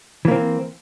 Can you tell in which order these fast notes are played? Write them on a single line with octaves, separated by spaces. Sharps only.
E3 A#3 C4